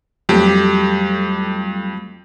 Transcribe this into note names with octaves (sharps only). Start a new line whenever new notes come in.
F2 F#3 G3 A3 G4